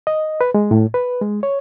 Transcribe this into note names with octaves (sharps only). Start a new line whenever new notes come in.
D#5
B4
G#3
A2
B4
G#3
C#5